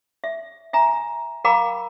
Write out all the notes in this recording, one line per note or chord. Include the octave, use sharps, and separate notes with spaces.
E5
E5 G#5 A#5
A#4 F5 G5 A#5 B5 D6